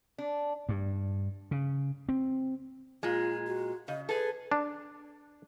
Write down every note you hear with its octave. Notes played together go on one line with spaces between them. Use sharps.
D4
G2
C#3
C4
A#2 G#3 F4
F#4
C#3 D#5
G#4 A4 B4
D4